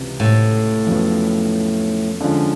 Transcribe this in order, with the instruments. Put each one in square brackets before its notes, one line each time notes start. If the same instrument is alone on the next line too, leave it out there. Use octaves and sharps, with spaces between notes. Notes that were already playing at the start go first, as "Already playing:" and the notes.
Already playing: [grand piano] C#2 C3 E3
[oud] A2
[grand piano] F2 C#3 F#3 B3
D3 F3 G#3 C#4